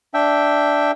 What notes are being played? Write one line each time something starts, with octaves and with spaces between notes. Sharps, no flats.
D4 E5 G5